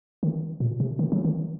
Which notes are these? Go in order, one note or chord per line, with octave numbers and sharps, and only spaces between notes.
D#3
A#2
C3
D#3
F#3
D#3